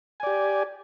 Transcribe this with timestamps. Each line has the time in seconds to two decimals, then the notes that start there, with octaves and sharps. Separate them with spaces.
0.20 G#5
0.23 D5
0.27 G4